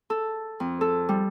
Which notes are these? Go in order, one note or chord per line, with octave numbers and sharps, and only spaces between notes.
A4
F2
A4
G3